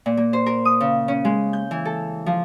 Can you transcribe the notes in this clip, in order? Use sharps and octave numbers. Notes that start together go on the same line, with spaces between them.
A#2
A#3
C5
A#4
D#6
C#3
C#4
G#3
G6
E3
A4
F3